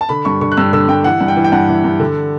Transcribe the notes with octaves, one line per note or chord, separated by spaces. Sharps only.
A5
D3 B5
G2 C#6
D3 C#6
F#6
G2 E6
D3 E6
G2 G5
E3 F#5
G2
G5
E3
G5
G2 F#5
E3
G2
D3